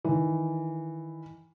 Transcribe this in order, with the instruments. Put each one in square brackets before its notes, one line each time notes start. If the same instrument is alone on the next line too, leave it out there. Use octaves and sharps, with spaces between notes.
[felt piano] D#3 E3